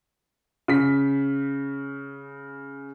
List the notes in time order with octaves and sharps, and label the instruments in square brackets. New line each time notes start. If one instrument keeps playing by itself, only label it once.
[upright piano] C#3 B6